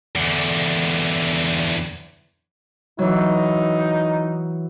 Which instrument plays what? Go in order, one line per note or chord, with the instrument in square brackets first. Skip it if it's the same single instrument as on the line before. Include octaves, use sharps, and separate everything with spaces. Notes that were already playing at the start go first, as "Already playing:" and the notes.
[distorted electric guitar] E2 D3
[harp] E3 F#3 [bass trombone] D#4